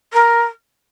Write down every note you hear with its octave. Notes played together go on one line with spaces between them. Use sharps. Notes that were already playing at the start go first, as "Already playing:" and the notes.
A#4